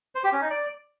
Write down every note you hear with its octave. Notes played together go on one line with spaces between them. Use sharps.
C5
G4
C#4
D#4
D5